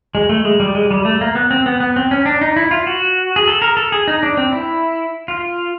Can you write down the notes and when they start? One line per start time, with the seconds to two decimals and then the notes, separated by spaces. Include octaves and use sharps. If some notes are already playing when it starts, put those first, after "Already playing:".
0.15 G#3
0.29 A3
0.45 G#3
0.60 G3
0.75 G#3
0.91 G3
1.05 A3
1.21 A#3
1.35 B3
1.51 C4
1.66 B3
1.80 B3
1.96 C4
2.11 C#4
2.26 D4
2.41 D#4
2.56 E4
2.71 F4
2.87 F#4
3.36 G#4
3.48 A4
3.62 A#4
3.77 A4
3.92 G#4
4.08 D#4
4.23 D4
4.37 C4
4.52 E4
5.28 F4